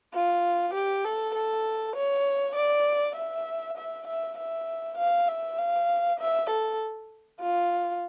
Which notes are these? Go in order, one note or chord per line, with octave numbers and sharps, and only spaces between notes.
F4
G4
A4
A4
C#5
D5
E5
E5
E5
E5
F5
E5
F5
E5
A4
F4